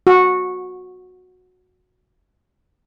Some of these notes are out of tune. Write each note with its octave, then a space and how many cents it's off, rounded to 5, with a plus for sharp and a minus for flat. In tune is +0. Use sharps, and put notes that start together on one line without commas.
F#4 -15